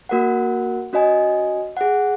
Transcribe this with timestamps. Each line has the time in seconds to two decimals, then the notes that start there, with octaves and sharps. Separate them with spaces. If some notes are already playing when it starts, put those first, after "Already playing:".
0.09 A#3 F#4 A#4 F#5
0.93 C#4 F#4 D#5 G#5
1.77 G#4 F#5